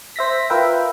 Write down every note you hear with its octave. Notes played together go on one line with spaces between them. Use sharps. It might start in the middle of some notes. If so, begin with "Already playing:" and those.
C5 E5 A#6 B6
F4 A#4 B4 E5 G5